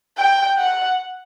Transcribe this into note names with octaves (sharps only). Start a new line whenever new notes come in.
G5
F#5